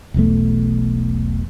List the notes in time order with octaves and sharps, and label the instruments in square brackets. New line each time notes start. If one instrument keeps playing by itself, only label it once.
[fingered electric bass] E1 B1 E2 A3